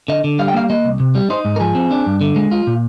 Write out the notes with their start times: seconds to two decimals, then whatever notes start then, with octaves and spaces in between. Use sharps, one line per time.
0.08 D3 D#5
0.24 D3
0.39 G3 F5
0.48 G5
0.54 A#3 F5
0.70 A#3 D#5
0.84 C2
1.00 C3
1.15 G3
1.30 D#4 C5
1.45 G#2
1.56 A#4
1.60 F3 G#4
1.75 C4
1.91 D4
2.06 G2
2.21 D3
2.36 G#3
2.51 F4
2.67 A#2